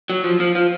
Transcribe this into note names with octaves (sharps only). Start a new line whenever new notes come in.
F#3
F3
F3
F3